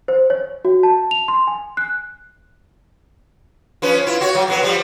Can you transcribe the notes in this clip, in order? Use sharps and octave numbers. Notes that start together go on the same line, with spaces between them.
C5
C#5
F#4
A5
F7
C6
G#5
F#6
F3 C#4 B4
E4 F4
F#4 C#5
F#3
F2 F#3 B3
F3 G3